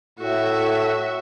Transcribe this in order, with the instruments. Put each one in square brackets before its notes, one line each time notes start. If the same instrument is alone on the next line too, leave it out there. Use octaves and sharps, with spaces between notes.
[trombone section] A2 [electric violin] F#4 E5